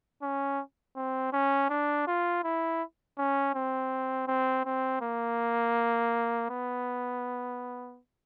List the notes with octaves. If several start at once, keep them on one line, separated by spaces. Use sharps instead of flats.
C#4
C4
C#4
D4
F4
E4
C#4
C4
C4
C4
A#3
B3